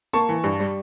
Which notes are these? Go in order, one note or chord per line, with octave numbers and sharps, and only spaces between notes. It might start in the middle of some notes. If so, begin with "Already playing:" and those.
A#3 A5 C#6
E3
G2
G3